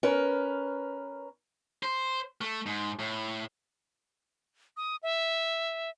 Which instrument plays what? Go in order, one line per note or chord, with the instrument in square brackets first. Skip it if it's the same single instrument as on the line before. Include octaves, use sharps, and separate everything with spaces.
[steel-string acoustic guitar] C#4 A#4 B4
[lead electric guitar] C5
A3
G#2
A2
[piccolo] D#6
E5